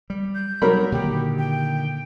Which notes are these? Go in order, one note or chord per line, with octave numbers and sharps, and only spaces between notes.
G3
G6
F#3 G3 A#4 B5
A#2 D3 D#3 G4
G5